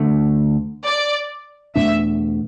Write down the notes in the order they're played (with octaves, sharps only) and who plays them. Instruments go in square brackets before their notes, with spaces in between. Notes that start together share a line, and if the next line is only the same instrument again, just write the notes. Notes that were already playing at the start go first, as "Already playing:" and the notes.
Already playing: [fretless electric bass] D2 D3 A3 D4
[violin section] D5
[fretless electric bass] E2 B2 A3 D4 [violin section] E5